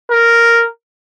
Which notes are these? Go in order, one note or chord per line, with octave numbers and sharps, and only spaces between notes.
A#4